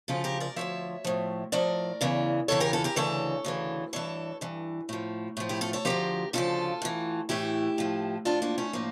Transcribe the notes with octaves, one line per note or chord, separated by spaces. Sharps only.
D2 C#3 F3 F4 A4
G4 A#4
A#4 D5
D2 C#3 F3 C#5 E5
A2 F3
A2 F3 A#4 D5
E2 C#3 E3
E2 C#3 E3 A4 C#5
G4 A#4
F4 A4
G4 A#4
D2 C#3 E3 A4 C#5
D2 C#3 E3
G2 E3 A4 C#5
G2 E3
A2 F3
A2 F3
E4 G4
F4 A4
A4 C#5
C#3 F3 G4 A#4
D2
D2 C#3 F3 F4 A4
A2 E3
A2 E3 E4 G4
A2 F3
A2 F3 D4 F4
A#3 D4
A3 C#4
A2 F3 A#3